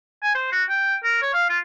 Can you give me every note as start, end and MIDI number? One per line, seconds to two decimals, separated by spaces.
0.23 0.34 80
0.35 0.51 72
0.52 0.63 66
0.69 0.96 79
1.04 1.19 70
1.22 1.33 73
1.33 1.48 77
1.49 1.59 65